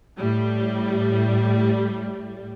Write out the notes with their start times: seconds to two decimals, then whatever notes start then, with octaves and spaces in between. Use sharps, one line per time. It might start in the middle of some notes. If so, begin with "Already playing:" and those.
0.18 A2 G3